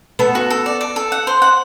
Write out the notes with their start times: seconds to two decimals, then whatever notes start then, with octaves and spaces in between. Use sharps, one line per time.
0.19 B3 A4
0.35 F#4
0.50 A4
0.66 D5
0.81 D5
0.96 A4
1.12 F#5
1.27 C5
1.42 F#5